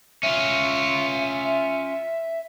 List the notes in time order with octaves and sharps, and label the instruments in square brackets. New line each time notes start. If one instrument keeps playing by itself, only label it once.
[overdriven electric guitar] C#4 F4 [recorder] E5